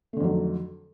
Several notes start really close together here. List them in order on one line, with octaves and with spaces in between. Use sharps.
A3 D3 F2 F#3 D#3